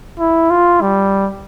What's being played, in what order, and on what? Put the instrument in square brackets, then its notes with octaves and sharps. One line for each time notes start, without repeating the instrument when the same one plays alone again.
[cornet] E4
F4
G3